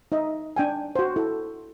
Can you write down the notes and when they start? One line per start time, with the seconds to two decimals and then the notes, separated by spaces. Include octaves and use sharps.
0.12 D#4 D#5 E5
0.56 D4 G5 G#5
0.96 F#4 C5
1.16 E4 A4